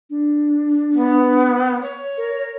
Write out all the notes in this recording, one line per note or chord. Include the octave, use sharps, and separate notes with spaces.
D4
B3
C#5
A#4